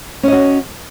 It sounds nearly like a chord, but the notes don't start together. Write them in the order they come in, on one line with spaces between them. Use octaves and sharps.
C#4 D#5 F#4